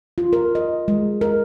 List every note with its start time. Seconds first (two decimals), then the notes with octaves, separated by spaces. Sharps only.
0.18 F4
0.33 A#4
0.55 D#5
0.88 G#3
1.21 A#4